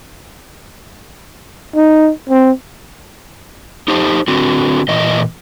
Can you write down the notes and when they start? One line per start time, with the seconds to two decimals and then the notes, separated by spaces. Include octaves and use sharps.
1.76 D#4
2.30 C4
3.88 D#4 G4 C5 A5
4.28 D3 C4 F#4
4.89 A#2 E3 D#5